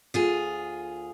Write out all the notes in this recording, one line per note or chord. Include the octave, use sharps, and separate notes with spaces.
D2 F4 G#4